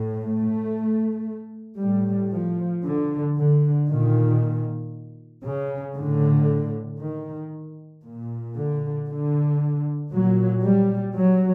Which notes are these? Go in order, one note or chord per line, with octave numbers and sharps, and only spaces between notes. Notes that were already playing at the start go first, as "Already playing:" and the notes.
Already playing: A2
A3
A2 G3
F3
D3
D3
A#2 D#3
C#3
A2 D3
D#3
A#2
D3
D3
A#2 F#3
G3
F#3